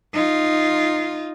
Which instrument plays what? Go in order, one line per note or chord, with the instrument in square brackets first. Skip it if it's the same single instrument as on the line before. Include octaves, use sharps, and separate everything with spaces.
[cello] D#4 F4